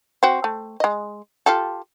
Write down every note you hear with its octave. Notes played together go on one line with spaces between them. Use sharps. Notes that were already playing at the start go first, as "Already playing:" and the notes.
C4 F#4
A3
G#3 D#5
F4 G4 A4